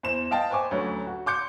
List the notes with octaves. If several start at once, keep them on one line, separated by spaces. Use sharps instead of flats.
E2 C5 E7
D#5 F5 G5 A5
B4 C5 G#5 C#6 D6
D2 F#3 C#4 B4
F#4
C6 D6 G6 C#7